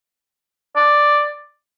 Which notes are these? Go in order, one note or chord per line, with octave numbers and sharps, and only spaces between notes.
D5